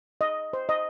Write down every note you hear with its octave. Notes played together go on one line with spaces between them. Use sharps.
D#5
C5
D#5